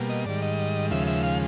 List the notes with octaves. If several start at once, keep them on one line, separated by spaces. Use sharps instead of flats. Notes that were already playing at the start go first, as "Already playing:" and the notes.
Already playing: B2 G3 A#3
D#5
G#2 D#3 G3 D5
D#5
D#2 C#3 F3 G#3 E5
E5
F5